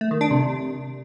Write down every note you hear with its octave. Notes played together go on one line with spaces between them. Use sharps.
A3
D#3
D4
C3